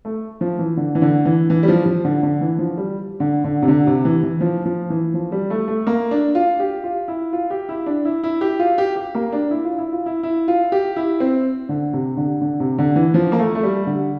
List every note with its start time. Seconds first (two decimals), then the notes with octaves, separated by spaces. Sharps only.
0.05 A3
0.41 F3
0.59 E3
0.77 D3
0.95 E3
1.02 D3
1.25 E3
1.50 E3
1.63 G3
1.68 F3
1.86 F3
2.04 D3
2.23 D3
2.41 E3
2.59 F3
2.77 G3
3.20 D3
3.44 D3
3.62 C3
3.68 D3
3.87 C3
4.05 E3
4.23 E3
4.41 F3
4.65 F3
4.90 E3
5.14 F3
5.32 G3
5.50 A3
5.68 A3
5.87 A#3
6.11 D4
6.35 F4
6.60 G4
6.84 F4
7.08 E4
7.33 F4
7.50 G4
7.69 E4
7.86 D4
8.05 E4
8.24 E4
8.41 G4
8.59 F4
8.78 G4
8.96 G4
9.15 A#3
9.33 D4
9.51 E4
9.65 F4
9.78 E4
9.93 F4
10.06 E4
10.23 E4
10.48 F4
10.72 G4
10.96 E4
11.20 C4
11.69 D3
11.93 C3
12.17 D3
12.41 D3
12.60 C3
12.78 D3
12.96 E3
13.14 F3
13.32 A#3
13.39 A3
13.55 A3
13.63 G3
13.87 D3